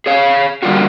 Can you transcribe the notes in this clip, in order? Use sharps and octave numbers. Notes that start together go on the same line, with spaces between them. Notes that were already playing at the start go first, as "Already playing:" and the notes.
G#4 C#5 F5
D3 G3 A#3 F4 F#4